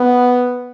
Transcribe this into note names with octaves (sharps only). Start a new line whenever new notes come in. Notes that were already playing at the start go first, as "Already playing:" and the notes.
Already playing: B3